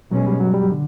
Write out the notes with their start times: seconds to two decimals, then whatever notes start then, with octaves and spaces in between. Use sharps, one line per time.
0.11 B2 F#3 G#3 C#4
0.26 G3
0.40 F#3
0.54 G3
0.72 D3